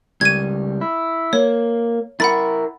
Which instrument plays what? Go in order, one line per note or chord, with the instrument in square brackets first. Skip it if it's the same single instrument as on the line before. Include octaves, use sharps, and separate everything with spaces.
[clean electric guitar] C#2 G3 [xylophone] G#6 D#7
[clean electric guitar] E4
[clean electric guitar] A#3 [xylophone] C#5
[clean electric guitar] E4 A#4 [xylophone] F#5 B5 A6